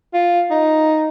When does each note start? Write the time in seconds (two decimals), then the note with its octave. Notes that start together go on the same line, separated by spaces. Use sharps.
0.14 F4
0.51 D#4